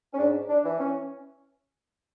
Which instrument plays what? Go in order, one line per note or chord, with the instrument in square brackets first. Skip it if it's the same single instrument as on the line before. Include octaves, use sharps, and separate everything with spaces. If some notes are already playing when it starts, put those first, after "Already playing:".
[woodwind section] C#4
G#2 D4
D4
E3
C#4